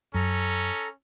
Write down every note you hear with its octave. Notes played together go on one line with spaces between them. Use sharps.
F#2 C#4 A4 A#5